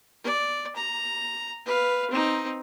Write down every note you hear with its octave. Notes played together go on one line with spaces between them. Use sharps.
D5
A#5
B4 F5
C4 D#4